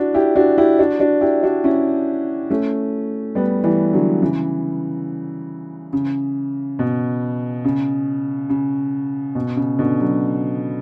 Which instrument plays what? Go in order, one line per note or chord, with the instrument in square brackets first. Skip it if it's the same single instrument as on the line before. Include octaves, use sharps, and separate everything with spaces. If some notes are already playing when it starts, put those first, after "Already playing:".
Already playing: [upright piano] D4 E4 F#4
E4 G4
D4 F#4
E4 G4
D4 F#4
D4 F#4
E4 G4
D4 F#4
C#4 E4
A3 C#4
G3 B3
E3 G3
D3 F#3
C#3 E3
C#3
B2
C#3
C#3
B2
C#3
B2 D3
D3 F#3